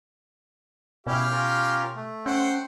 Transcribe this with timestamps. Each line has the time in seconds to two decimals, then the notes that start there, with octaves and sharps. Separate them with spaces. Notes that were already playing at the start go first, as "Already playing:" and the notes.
1.07 B2 C#4 E4 G4 F5
1.32 C#4 F4 A#4
1.95 A3
2.26 C#4 C5 F#5 G5